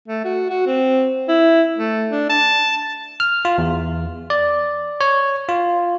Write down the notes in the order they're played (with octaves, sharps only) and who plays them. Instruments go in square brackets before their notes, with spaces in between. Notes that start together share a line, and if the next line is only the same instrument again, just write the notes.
[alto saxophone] A3
F#4
F#4
C4
E4
A3
D4
A5
[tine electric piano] F6
F4
E2
D5
C#5
F4